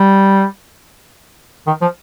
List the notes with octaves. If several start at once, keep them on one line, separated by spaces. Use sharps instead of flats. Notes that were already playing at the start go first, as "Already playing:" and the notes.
Already playing: G3
D#3
F3